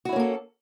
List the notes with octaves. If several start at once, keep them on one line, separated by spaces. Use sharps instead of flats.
A#3 C#4 E4 F#4 A4